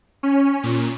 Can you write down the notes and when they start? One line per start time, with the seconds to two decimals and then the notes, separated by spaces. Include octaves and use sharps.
0.23 C#4
0.63 A#2